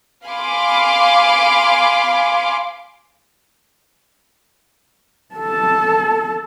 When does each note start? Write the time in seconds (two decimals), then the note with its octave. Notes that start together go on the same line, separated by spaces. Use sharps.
0.25 F5 G#5 B5 C6 D6
5.36 A4 A5